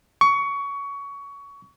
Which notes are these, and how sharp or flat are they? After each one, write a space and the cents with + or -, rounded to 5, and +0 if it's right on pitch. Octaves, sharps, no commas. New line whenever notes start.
C#6 +20